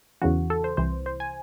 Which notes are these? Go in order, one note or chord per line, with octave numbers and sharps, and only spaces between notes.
E2 C#3 E3 F#4
A4
C5
C2 C3 E3 C5
C5
G#5